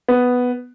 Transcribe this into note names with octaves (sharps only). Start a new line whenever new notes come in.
B3